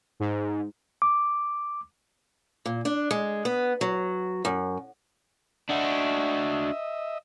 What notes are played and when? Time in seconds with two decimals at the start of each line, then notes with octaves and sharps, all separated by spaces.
0.20 G#2
1.02 D6
2.66 A#2
2.85 D4
3.11 G#3
3.45 B3
3.81 F#3
4.45 F#2
5.70 D4 F#4 D#5 E5